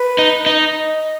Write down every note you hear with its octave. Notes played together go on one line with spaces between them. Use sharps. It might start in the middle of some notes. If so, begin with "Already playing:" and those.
Already playing: B4
D#4
D#4 D#5